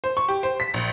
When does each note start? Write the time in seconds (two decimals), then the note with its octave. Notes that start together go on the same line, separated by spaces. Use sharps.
0.04 C5
0.17 C#6
0.28 G4
0.43 C5
0.60 B6
0.74 A#1